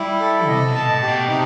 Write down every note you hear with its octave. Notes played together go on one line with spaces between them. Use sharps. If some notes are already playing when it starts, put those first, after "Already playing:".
Already playing: G3 E4
A4
C3 D#5
B2
A5
A2
G4
B2
C3 D#4